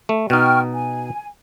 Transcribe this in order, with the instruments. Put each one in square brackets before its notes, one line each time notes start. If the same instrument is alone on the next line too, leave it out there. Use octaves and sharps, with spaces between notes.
[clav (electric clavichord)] A3
[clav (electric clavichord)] B2 D#4 [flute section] G5 C#6 F6
[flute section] G#5